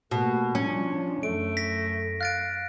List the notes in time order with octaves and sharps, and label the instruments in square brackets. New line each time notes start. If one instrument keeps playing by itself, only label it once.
[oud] B2 [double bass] A3 A#3
[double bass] F3 D4 [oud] C#4
[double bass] F#2 [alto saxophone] A3 [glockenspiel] D7
[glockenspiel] A#6 B6
[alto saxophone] F5 [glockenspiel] F#6 A6 D7